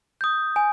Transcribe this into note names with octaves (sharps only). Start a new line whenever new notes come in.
D#6 G6
G#5